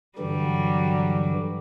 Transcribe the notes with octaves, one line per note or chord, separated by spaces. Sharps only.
G2 D3 E3 F#3 G3